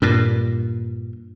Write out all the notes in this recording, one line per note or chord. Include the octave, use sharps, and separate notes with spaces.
G2 A#2